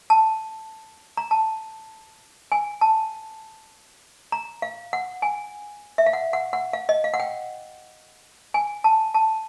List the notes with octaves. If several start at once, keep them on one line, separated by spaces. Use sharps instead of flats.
A5
A#5
A5
G#5
A5
A#5
F5
F#5
G#5
E5
F5
F#5
F#5
F#5
F5
D#5
F5
F#5
G5
G#5
A5
A5